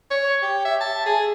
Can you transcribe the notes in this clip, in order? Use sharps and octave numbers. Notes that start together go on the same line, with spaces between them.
C#5
G4
E5
A5
G#4